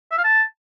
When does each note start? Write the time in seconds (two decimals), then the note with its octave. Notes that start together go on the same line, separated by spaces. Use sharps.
0.11 E5
0.18 F5
0.24 A5